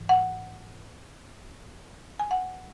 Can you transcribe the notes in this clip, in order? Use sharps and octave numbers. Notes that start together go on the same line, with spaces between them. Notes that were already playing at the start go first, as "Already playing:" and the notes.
Already playing: G#2 E3
F#5
G#5
F#5